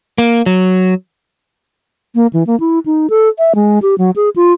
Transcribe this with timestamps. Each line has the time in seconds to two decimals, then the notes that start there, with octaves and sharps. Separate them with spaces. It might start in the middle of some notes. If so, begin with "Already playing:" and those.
0.18 A#3
0.46 F#3
2.15 A#3
2.33 E3
2.47 A#3
2.60 E4
2.86 D#4
3.10 A4
3.39 E5
3.55 G#3
3.82 G4
3.98 F#3
4.16 G#4
4.36 F4